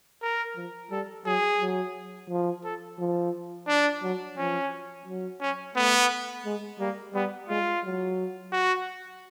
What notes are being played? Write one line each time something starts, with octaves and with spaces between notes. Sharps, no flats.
A#4
F3
G3 A4
F#3 G#4
F#3
F3
A4
F3
D4
F#3
F3 C#4
F#3
C#4
A3 B3
G#3
G3 A#3
G3 B3
G#3 F4
F#3
F#4